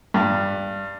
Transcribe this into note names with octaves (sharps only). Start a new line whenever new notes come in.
G2